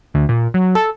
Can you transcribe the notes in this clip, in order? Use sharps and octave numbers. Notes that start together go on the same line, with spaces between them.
D2
A#2
F#3
A4